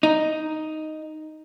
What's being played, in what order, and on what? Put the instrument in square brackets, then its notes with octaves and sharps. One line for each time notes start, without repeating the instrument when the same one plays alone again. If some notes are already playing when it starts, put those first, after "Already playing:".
[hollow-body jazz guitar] D#4